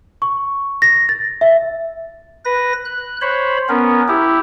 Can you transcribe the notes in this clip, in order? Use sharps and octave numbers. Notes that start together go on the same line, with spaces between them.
C#6
A#6
A6
E5
B4 A#6
F#6
C5 C#5 B5
B3 C#4 A#4
E4 G4